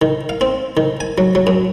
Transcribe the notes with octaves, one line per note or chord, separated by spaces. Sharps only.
D#3
F5
C4
D#3
G#5
F#3
F#3
F#2